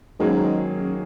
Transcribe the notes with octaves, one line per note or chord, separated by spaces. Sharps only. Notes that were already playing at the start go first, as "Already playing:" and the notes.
G#2 D#3 F#3 A#3 C#4 G#4
F#2